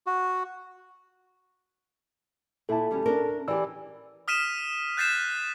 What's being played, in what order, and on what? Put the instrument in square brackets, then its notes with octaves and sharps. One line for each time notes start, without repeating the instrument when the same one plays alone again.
[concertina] F#4
[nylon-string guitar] A#2 E4 [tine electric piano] A4 A5
[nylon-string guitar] D2 G3 C#4
C#4 D4 A#4
[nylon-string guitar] E3 G4 [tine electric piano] D5 E6
[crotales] D#6 F6 B6 D#7 E7
F#6 G6 A6 B6 C7 E7